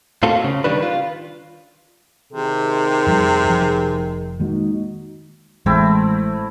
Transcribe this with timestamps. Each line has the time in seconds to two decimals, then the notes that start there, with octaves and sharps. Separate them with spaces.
0.23 A2 C4 F4 F#4 A4
0.44 C#3
0.64 D#3 G3 D4 B4
0.83 F4
2.33 C3 D#3 G#4
3.06 F2 F3 G3
3.48 F1 F3
4.40 D#3 G#3 A#3 D#4 F#4
5.66 A1 G#3 A3 C4 E4